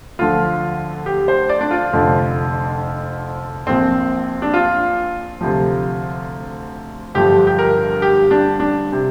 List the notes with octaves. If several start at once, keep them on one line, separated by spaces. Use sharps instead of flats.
D2 D3 F3 F4
G4
C5
D5
D4
F4
F1 F2 D3 F3
A#1 A#2 F3 C4
D4
F4
D2 C3 F3
G1 G2 F3 G4
G4
A#4
G4
D4
D4
C3